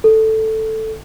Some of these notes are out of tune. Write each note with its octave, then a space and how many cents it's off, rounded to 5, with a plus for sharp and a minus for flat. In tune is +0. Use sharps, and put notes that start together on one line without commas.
A4 +0